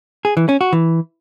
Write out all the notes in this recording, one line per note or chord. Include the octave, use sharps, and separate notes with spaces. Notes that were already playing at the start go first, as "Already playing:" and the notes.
G#4
E3
C#4
F#4
E3